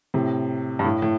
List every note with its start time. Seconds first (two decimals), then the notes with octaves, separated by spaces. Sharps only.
0.14 A2 C3
0.79 G2
0.84 A2
1.02 A2